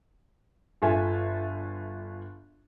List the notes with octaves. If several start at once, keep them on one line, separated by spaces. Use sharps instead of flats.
G1 F4 A4 E5 G#5